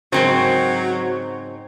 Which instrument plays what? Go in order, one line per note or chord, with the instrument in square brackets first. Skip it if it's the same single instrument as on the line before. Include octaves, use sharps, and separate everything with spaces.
[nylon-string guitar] G#2 A#4 C5 [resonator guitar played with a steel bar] C#3 C4 F#4 [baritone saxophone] F#3